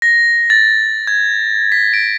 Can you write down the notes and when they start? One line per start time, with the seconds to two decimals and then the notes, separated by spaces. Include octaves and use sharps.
0.02 A#6
0.50 A6
1.07 G#6
1.72 B6
1.93 D7